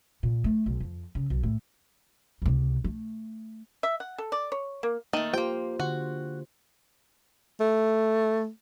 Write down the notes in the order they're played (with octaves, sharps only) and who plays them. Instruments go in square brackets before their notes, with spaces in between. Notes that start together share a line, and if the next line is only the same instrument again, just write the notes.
[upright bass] A#2
A3
B1
F2
C#3
B1
A2
C#2 C3
A3
[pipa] E5
F#5
A4
D5
C#5
A#3
[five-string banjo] D#3 A3 [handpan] A#3
[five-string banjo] A#3 G5 [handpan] F4 G4 C5
[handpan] D3 [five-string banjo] F#4
[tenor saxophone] A3